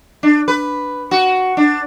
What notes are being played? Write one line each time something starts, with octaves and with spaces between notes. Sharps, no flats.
D4
B4
F#4
D4